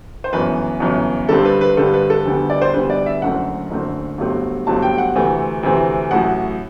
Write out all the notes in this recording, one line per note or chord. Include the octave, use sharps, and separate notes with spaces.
C5
G1 F#2 E3 B4
G1 F#2 E3
G2 D3 G3 C4 A4
B4
B4
G2 D3 G3 C4 A4
B4
A4
D2 D3 G3 B3
D5
C5
D2 D3 G3 B3 B4
D5
E5
F#1 F#2 D3 A3 C4 F#5
F#1 F#2 D3 A3 C4
G1 G2 F#3 A3 C4
G1 G2 F#3 A3 C4 A5
G5
F#5
D2 C3 E3 A3 C4
D2 C3 E3 A3 C4
A1 A2 F#3 F#5